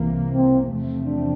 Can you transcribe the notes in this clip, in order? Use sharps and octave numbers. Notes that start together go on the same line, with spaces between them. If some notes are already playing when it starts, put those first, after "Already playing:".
Already playing: C2 C3 E3 A#3
C4
E2 C3 F3 A3 C4
D4